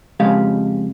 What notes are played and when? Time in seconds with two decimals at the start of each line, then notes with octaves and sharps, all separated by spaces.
0.20 F2 C#3 G#3 G4 F5